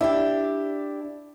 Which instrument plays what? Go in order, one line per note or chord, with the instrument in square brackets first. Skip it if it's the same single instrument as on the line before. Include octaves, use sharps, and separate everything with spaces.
[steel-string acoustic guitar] D4 G4 [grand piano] E4